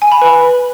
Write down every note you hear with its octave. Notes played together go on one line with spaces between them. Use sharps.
G#5
B5
B4